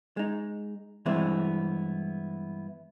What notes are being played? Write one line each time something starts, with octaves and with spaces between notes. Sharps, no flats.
G#3 D#4
G2 E3 G#3 B3 C4 E4